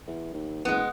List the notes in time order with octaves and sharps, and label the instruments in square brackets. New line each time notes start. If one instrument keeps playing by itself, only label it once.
[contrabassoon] E2
D#2
[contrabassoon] F#1 [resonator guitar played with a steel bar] G#3 B3